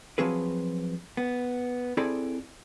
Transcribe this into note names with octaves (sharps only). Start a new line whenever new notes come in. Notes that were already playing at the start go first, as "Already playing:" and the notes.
F3 F#3 C4 G#4 B4
B3
C4 E4 G#4 A4 D5 B5